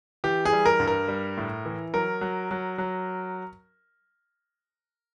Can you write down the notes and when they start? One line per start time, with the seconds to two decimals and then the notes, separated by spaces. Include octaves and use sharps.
0.24 E3 G4
0.45 G#4
0.53 G3
0.66 A#4
0.80 G2
0.87 A#4
1.08 G3
1.37 A2
1.66 E3
1.94 F#3 A#4
2.21 F#3
2.51 F#3
2.78 F#3